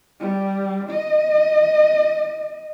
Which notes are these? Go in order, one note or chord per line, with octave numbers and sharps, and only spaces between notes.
G3
D#5